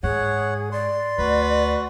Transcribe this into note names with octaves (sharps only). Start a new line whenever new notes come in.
G#2 G#4 C#5 F#5
D5 C6
D2 F#4 B4